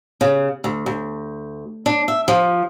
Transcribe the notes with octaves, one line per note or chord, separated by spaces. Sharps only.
C#3
D2
D2
D4
E5
F3